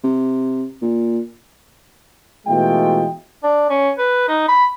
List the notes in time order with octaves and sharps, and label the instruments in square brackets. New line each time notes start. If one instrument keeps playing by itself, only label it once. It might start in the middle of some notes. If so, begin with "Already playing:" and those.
[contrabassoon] C3
A#2
[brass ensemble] B2 E3 G#3 A3 F4 G5
[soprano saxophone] D4
C#4
B4
D#4
B5